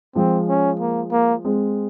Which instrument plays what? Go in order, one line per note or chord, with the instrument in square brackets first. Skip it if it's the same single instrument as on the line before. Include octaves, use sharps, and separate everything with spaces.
[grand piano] F3 G#3 [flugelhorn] C4
[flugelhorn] C#4
A#3
A#3
[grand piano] G#3 C4